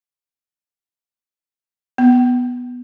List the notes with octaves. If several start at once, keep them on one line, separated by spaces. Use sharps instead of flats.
B3